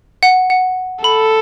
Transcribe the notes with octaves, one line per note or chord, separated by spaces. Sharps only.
F#5
F#5
A4 B5